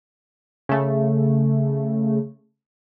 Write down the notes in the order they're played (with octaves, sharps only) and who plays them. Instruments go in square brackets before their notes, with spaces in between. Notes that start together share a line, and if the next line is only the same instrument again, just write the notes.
[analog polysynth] C#3 A3